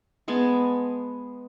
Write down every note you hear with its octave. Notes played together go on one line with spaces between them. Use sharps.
G#3 B3 G#5 A5